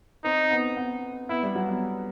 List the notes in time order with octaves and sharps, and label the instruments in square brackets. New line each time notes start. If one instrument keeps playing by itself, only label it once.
[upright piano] C4 [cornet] D#4
[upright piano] B3
B3
[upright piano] B3 [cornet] E4
[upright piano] G3
F#3
B3